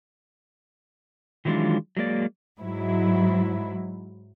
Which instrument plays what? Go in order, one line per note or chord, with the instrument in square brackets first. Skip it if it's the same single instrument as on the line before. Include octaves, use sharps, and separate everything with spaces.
[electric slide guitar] D#3 E3 F#3 G#3 D4 F4
F#3 G#3 A#3 D5
[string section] G#2 F#3 E4